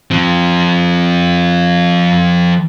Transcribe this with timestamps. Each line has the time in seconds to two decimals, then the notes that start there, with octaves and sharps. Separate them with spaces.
0.11 F3 C4